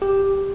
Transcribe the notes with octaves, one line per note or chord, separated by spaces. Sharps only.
G4